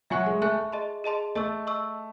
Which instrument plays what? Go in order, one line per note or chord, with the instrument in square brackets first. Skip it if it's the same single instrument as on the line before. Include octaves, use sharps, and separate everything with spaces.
[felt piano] F#3 [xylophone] E5 G#5 C#6 F#6
[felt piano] G#3
[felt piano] A3 [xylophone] E5 G#5 C#6 F#6
[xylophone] G#4 D#5 A5 C6
G#4 D#5 A5 C6
[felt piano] A3 [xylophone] D#5 A5 C#6 E6
[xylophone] D#5 A5 C#6 E6